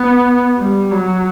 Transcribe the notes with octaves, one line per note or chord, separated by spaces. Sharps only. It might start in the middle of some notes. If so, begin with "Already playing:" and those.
Already playing: B3
G3
F#3